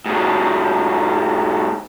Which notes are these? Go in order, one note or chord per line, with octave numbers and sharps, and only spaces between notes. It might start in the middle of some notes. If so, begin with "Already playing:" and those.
G#2 B2